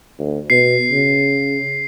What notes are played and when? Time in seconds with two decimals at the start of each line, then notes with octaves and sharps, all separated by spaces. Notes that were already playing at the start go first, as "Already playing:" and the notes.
0.19 D2
0.50 B2 C7
0.91 C#3